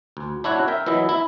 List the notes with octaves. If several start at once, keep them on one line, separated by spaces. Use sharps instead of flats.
D2
D4 E4 F#4 C#5 F#5
A#4 E5 G5
E3 F#3 E4 D#5 E5
E4 E5